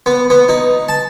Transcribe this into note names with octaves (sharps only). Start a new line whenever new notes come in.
B3
B3
D#4
A5